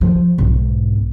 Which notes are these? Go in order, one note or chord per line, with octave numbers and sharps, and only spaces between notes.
F3
B1 G#2